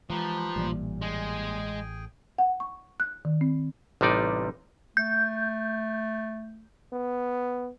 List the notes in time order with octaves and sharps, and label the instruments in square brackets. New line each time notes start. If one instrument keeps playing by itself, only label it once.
[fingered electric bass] E3 G#3 [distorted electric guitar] F3 [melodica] D#4 G4 B4
[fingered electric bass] A1 E3 [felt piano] G2 A#2
[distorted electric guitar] G#3 [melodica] G#4 G5 G#5
[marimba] F#5
C#6
F#6
D#3
C4
[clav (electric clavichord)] A1 C3 G3 D#4 D5
[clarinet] A3 [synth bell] G6
[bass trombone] B3